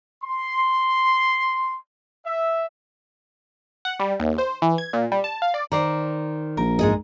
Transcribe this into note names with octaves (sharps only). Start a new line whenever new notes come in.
C6
E5
F#5
G3
D#2
C5
E3
G#6
A#2
G3
A5
F5
D5
D#3 C5 D5 A#5
A#1 A#4
G#2 G#4 D#5